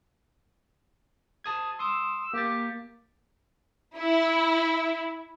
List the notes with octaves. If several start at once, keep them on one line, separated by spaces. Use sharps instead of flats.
A5 D#6 G#6
C6 D#6 E6
A#3 G4 A6
E4